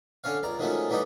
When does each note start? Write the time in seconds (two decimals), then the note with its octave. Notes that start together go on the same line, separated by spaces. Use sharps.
0.24 D3 C#4 C#5 F5
0.43 C#2 D5 A#5
0.59 D#3 F3 F#3 G#3 A3 C#4
0.89 E3 F#3 G3 A3 D#4 G4